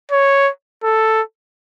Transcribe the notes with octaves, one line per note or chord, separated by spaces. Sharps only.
C#5
A4